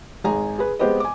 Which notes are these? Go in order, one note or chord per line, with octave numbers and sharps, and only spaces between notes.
G#1 G#4 G#5 A#5
G#4 B4
G#3 B3 C4 G4 B4 D#5
G#5 D6